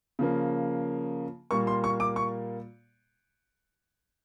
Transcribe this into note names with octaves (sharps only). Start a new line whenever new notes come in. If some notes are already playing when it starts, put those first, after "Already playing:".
C#3 F3 A#3
A#2 G3 A#3 C#6
C6
C#6
D6
C#6